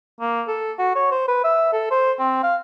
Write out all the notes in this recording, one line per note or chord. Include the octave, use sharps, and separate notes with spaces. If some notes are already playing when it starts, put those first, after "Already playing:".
A#3
A4
F#4
C#5
C5
B4
E5
A4
C5
C4
F5